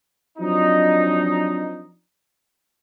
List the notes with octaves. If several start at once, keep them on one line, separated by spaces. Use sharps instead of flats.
F3 F#3 C4 D4 D#4